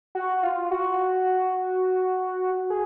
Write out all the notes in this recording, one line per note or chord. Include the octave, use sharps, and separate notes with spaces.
F#4
F4
F#4
G#4